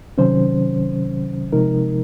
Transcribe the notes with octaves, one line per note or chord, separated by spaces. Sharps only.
C3 D#3 F#3 C#4 C5
C3 F3 G#3 D#4 A#4